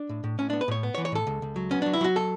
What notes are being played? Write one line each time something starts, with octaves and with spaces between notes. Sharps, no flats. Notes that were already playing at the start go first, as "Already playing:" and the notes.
Already playing: D4
A2
A2
A2 C#4
B3 D4
B4
A2 C#5
B3
C#5
E3
C#5
A2 A4
C#2
C#2
F#3
B3 C#4
F#3 D4
E4
F#3 F#4
A4